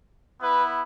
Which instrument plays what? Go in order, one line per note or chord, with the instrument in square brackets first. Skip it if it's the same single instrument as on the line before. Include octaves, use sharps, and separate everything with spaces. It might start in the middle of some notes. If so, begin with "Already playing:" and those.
[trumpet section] B3 E4 B4